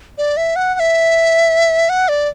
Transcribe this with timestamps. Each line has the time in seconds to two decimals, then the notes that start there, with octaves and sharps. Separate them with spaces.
0.18 D5
0.37 E5
0.56 F#5
0.75 F#5
0.80 E5
1.89 F#5
2.08 D5